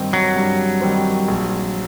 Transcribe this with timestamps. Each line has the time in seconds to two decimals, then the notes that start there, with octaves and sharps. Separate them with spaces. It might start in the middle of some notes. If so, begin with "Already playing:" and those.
Already playing: G2 D#3 G3 C4
0.13 F#3
0.36 G2
0.81 D#3 G3 C4
1.28 A#1